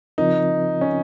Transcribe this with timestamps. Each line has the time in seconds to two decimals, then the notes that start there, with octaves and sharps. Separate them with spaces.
0.18 C#3 F3 C4 D#4 F4 A#4
0.81 C#4